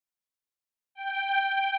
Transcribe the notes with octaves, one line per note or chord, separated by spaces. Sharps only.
G5